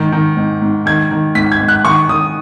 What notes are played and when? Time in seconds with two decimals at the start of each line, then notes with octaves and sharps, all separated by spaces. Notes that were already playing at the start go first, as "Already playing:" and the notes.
Already playing: G#2 D#3
0.12 D#3
0.37 G#2
0.62 G#2
0.86 D#3 G#6
1.11 D#3
1.35 G#2 B6
1.52 G#6
1.60 G#2
1.68 F#6
1.85 D#3 C#6
2.09 D#3 D#6